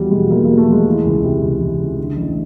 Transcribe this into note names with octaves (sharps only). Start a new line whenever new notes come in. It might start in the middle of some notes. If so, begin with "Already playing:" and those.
Already playing: E2 F#3 G3
B2 G#3
E2 A#3
A#3
F#3
A3
E2 G#3
E3
C#2
C3
C#2
E3
C#2
D3
A1